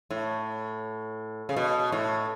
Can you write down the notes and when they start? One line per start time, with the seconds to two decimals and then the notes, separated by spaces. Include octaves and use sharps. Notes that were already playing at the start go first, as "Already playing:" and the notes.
0.10 A2
1.49 C#3
1.56 B2
1.92 A2